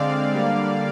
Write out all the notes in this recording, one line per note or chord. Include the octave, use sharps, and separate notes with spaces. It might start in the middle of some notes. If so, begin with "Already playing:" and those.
Already playing: D3 G#3 C4 D5 F5
D3 G3 A#3